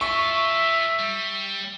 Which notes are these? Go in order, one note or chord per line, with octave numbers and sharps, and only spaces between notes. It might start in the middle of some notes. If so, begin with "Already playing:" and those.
F4 A4 E5 C#6
G3